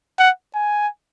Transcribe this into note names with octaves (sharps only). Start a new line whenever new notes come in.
F#5
G#5